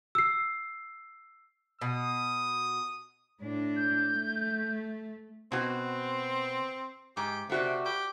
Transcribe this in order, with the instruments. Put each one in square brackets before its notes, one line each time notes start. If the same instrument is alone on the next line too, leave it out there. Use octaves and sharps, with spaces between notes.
[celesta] E6 C7
[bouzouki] B2 [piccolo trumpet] D#6
[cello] A2 D4
[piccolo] G6
[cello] A3
[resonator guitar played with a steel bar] B2 F#4 [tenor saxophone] C4
[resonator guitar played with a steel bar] G#2 [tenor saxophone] G4
[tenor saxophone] C3 [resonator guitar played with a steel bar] A3 F#4 D5
[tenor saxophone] G4